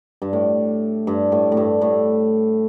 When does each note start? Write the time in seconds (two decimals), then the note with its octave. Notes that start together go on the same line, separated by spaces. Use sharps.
0.22 G2
0.33 A2
1.07 G2
1.32 A2
1.52 A2
1.57 G2
1.81 A2